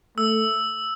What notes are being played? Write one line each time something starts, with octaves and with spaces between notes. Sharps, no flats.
A3 E6